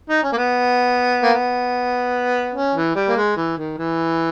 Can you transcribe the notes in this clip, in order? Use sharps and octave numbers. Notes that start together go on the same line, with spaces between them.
D#4
C#4
A#3
B3
A#3
B3
C#4
E3
G3
A#3
G#3
E3
D#3
E3